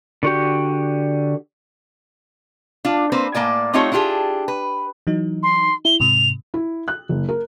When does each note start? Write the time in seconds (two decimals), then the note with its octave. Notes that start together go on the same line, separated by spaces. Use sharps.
0.23 D3 F#4 G4
2.85 D4 F4
3.12 A#3 C4 B4 C5
3.34 A2 A#3 D5 G#5
3.73 A3 C4 D#4 F4 G4 C#5
3.92 D4 E4 F4 G4 G#4
4.48 B4
5.07 E3 F#3 D#4
5.43 C6
5.85 E4 G7
6.00 G#2 C3 F7
6.54 E4
6.88 F#6
7.09 F#1
7.29 A#4